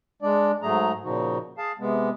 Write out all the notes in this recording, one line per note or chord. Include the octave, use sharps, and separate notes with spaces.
G#3 D4 D5
G#2 F#3 A3 G#4 A#5
A#2 C#3 F3 D#4 F#4
G#4 F5 A5
C3 G#3 B3